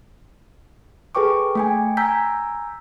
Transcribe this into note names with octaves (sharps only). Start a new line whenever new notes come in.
G#4 A4 B4 G5 C#6 D6
A3 G5 G#5
G#5 A#5 E6 G6 B6